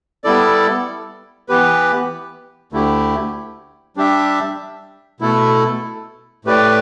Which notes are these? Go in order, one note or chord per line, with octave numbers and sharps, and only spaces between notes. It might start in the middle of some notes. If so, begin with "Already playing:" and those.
G3 B3 E4 A4 D5
E3 B3 G4 B4
D2 D3 A3 E4 G4
G3 D4 G4 E5
B2 A3 E4 A4
A2 A3 G4 B4 D5